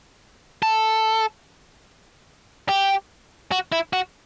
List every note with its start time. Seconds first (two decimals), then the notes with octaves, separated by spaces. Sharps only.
0.63 A4
2.69 G4
3.52 F#4
3.72 E4
3.93 F#4